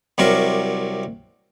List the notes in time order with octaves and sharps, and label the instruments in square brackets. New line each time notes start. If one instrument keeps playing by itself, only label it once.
[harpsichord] C2 C3 F#3 A#4 C#6